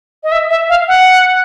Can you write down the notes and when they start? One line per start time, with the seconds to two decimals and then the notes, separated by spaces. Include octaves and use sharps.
0.24 D#5
0.32 E5
0.50 E5
0.69 F5
0.88 F#5